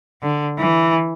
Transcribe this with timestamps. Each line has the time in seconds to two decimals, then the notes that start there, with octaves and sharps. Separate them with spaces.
0.22 D3
0.58 E3